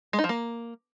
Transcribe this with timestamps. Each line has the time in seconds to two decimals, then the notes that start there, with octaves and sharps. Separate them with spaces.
0.13 G#3
0.19 D#4
0.24 F3
0.29 A#3